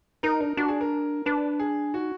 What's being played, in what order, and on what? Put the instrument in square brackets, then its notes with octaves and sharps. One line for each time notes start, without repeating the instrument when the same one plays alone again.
[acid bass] D#4 [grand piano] A#4
[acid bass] D4 [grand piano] A#4
[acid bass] D4 [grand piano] F#4
[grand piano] G#4
A#4
[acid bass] D4 [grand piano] B4
[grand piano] G#4
[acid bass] D#4 [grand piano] F#4